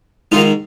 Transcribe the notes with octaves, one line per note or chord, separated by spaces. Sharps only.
G#2 D#3 D#4 F4